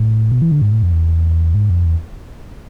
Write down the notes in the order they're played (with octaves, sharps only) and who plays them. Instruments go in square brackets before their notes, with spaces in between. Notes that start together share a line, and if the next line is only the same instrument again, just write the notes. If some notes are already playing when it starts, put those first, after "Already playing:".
Already playing: [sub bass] A2
B2
E3
D3
G#2
A2
F2
E2
G#2
F2
E2